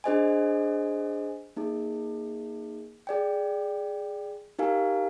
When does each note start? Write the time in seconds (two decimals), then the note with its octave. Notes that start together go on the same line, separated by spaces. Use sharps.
0.04 D4 G#4 C5 D#5 G#5
1.56 A#3 D#4 G#4
3.07 G#4 D5 G5
4.58 D#4 G4 A#4 F5 G#5